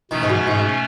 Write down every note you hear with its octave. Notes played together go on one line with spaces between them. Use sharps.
B2 D#3 A3 C#4
G#2
F#2
G#2